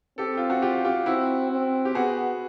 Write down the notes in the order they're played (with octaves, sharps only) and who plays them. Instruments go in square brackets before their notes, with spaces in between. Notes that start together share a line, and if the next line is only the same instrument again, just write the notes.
[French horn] C4 [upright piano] G4 A4
[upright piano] F4
F#4
F4 G4
F4 G4
[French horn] C4 [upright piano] E4 F#4
[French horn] C4
[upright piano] G4
[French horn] B3 [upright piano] F#4 G#4